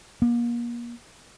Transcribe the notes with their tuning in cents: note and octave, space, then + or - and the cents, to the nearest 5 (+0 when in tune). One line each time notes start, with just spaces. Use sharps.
A#3 +35